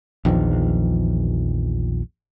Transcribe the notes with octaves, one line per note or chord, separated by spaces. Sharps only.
A#1 E2 D#3 F3